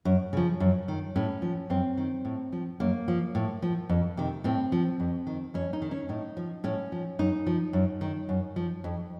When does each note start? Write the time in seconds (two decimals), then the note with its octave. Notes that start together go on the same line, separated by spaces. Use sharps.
0.05 F#2
0.33 C#3 F3
0.60 F#2
0.88 D#3
1.16 A2 C#4
1.42 F3
1.70 F#2 C4
1.97 D#3
2.25 A2
2.52 F3
2.80 F#2 A#3
3.08 F3
3.35 A2
3.62 F3
3.89 F2
4.17 C3 D#3
4.44 A2 C4
4.72 F3
5.00 F2
5.27 D#3
5.54 F2 C#4
5.73 D#4
5.82 D#3
5.91 C#4
6.09 A2 D#4
6.37 F3
6.64 A2 C#4
6.92 F3
7.19 F#2 D#4
7.46 F3
7.73 F#2
8.01 D#3
8.29 F#2
8.56 F3
8.84 F2